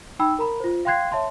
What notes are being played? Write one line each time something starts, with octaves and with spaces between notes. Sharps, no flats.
D#4 G5 B5 E6
A#4 A#5 B5
F4 C5
F5 G5 C6 F#6 G#6 C7
C#5 E5 A5 C6